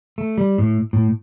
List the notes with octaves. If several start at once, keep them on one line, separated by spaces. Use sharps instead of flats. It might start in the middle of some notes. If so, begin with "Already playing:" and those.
A3
G3
A2
A2